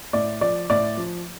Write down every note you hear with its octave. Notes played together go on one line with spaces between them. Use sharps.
A2 D5
F3 D5
A2 D5
F3